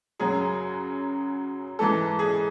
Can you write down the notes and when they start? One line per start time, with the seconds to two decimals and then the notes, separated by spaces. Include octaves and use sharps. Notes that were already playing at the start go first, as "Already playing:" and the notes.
0.20 F#2 C#3 F#3 G#4
1.79 G#2 E3 A4
2.19 G#4